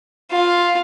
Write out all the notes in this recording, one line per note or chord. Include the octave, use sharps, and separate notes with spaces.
F4